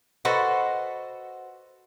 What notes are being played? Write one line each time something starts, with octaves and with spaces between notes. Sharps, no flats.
F#4 A4 B4 C5 D#5 F#5